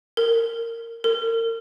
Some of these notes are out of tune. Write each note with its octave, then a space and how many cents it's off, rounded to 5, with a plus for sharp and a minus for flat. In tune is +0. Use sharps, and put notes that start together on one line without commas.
A#4 -20
A#4 -35